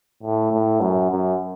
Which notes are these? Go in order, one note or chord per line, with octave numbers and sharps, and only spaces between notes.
A2
A2
F#2
F#2